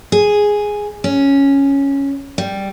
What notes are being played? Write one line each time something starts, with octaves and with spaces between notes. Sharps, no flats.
G#4
C#4
G3